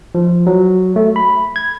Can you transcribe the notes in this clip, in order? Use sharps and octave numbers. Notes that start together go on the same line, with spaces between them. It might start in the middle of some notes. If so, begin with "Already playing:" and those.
F3
F#3
A3
B5
G#6